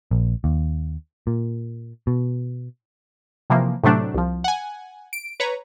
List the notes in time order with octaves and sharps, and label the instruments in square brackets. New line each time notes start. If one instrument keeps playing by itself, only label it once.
[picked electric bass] A#1
D#2
A#2
B2
[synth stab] C3 E3 F3 A#3
A2 C3 F#3 A3 D4
C2 F3
F#5 G#5
D7
B4 C#5 A#5